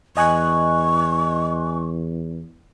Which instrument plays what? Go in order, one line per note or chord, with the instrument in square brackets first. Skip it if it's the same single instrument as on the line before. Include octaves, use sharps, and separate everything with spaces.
[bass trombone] E2 [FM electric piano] D#5 G#5 F#6 [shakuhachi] C#6